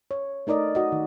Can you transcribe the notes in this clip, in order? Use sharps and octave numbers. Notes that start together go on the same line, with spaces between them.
C#5
A3 D#4 A#4 D5 D#5
F#4 D#5
D#3